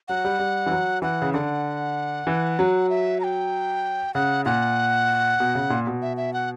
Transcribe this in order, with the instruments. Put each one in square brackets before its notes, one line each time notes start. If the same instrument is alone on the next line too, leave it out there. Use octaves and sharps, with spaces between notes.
[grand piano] F#3 [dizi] F#5
[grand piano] G3
G3
E3
F#3
[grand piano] E3 [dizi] F#5
[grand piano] C#3
[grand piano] D3 [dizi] F#5
[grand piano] E3
F#3
[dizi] E5
A#5
G5
[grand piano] C#3 [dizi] F#5
[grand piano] A#2 [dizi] F#5
[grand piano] B2
C#3
A#2
B2
[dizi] E5
E5
F#5